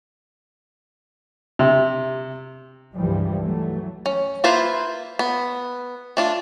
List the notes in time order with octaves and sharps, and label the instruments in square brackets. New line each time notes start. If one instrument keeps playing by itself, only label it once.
[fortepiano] C3
[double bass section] C#2 G2 E3 F3 G3
E3 F#3 A3
[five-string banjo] C#4
A#3 E4 F4 B4 C5
B3
A3 D4 F4